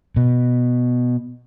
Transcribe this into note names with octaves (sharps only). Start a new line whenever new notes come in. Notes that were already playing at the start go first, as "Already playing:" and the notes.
B2